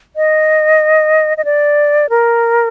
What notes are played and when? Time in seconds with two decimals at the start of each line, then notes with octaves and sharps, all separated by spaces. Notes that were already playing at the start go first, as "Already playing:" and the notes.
0.16 D#5
1.37 D#5
1.45 D5
2.10 A#4